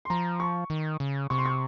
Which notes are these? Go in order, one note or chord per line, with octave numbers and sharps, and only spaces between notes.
C6
F3 A#5
C#6
D#3
C#3
C3 C#6
C6
C#6